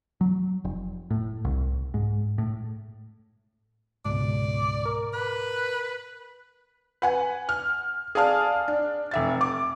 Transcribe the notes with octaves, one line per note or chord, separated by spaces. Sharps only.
F#3
F1
A2
C2
G#2
A2
C#2 G#2 B2 D5
A#4
B4
B4 F#5 G#5
F6
G#4 D5 F5 A5 F6
D4
F1 E5 A6
D6